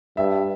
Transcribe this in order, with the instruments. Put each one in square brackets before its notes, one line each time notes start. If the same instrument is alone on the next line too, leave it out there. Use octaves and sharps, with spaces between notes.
[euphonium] G2 [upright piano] E5